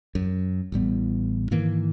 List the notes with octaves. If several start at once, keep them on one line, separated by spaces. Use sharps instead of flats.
F#2
A1 A2 G3 B3
G#2 D#3 E3 A#3